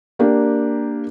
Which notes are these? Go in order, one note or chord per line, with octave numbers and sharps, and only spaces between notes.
A#3 D4 G4 A#4